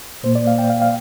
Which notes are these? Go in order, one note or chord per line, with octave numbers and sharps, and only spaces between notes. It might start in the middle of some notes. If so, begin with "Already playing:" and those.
A#2 A#3 C5
D5
F5
G5
F5
F5